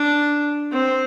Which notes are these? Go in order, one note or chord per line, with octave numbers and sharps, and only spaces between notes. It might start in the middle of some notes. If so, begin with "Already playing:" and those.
Already playing: D4
C4